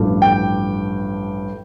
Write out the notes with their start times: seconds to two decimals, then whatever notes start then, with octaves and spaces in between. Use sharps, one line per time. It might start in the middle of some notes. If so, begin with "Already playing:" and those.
Already playing: A1 G2 F3 A3
0.22 G5